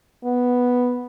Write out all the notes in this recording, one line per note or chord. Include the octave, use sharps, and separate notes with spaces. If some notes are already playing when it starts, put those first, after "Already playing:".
B3